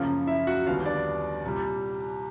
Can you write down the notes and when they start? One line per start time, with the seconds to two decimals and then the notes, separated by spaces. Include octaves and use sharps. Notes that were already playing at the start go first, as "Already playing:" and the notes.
Already playing: F#2 C#3 F3 A#3
0.27 E4 E5
0.47 F#4 F#5
0.66 D#2 D3 G3 B3 F4 F5
0.85 D4 D5
1.44 C2 A#2 G3